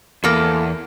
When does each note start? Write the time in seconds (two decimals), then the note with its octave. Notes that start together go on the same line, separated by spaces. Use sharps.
0.24 E2 A#3 A4